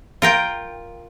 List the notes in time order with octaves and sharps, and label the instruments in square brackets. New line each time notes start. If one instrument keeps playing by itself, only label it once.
[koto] F4 A#4 G5